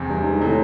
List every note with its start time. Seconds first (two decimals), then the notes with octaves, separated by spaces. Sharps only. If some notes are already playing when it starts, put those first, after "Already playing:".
Already playing: F1 E2 C3
0.09 G2
0.25 G#2
0.41 A2 C3